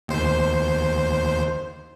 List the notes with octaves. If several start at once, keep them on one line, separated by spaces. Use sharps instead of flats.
D#2 C5